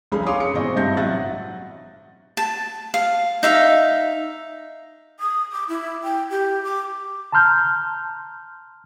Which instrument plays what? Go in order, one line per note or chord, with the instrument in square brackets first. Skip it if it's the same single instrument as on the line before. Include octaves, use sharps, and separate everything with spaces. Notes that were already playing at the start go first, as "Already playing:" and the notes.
[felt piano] F1 C2 G#3 C#4 G#4 B5
G#4 C#5 F5 C6 D6 D#6
C#7
G#1 B2 E3 C4 D#5 C#6
G2 C3 C4 E5 G6 A#6
A1 F#3 E5 F#5 F#6 A6
[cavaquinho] A5
F5
D#4 E5 F5
[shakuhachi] D#6
D6
E4
G5
G4
D6
[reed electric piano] A5 A#5 C6 F6 G6